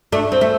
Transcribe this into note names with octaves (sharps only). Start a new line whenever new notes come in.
A3 D4
C4
A3